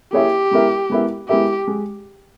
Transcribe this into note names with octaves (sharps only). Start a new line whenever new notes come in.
A#3 E4 G4 G#4 C#5 E5
G#3 B3 E4 A#4 E5
G#3 B3 E4 A#4 E5
G#3 B3 E4 G4 A#4 E5
G#3